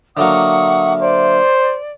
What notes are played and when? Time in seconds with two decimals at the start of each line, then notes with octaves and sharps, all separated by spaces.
0.17 D3 F#3 A#3 E5 F#5 C#6 D#6
1.02 C5 D5